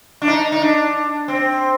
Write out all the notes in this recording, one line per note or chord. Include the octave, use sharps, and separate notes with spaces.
D4
D#4
D#4
D4
C4